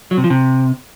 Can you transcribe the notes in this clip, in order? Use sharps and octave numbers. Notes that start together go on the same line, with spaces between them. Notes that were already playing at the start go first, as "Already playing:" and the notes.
F#3
C3
F3
C3